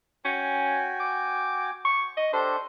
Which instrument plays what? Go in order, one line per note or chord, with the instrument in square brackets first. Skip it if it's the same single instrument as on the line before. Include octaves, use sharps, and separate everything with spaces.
[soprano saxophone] C#4 [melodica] F#4 G5 G#5
[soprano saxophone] D6
C#6
D#5
[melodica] D4 G4 A4 [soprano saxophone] C5